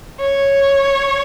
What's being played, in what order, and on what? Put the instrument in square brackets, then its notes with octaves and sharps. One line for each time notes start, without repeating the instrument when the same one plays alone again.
[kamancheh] C#5